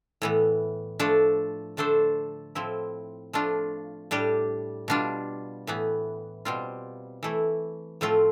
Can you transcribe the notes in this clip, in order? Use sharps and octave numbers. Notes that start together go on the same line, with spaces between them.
A2 E3 B3
F3 A3 D4 A4
D3 A3 D4 A4 C5
A2 F3 C4 E4
F3 A3 D4 F4
A2 G3 D4 G4
B2 G3 D4 F4
A2 E3 B3
B2 G3 C4 F4
E3 A3 E4
A2 F3 A3 C4 F4